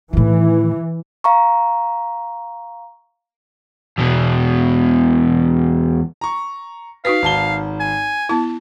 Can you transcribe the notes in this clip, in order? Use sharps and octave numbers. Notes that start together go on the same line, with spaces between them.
A2 D#3 E3
F5 A#5 C#6
E2 B2
A#5 C#6
D#4 F#4 B4 F5 B6
G#1 A5 G7
G#5
B3 E4 A5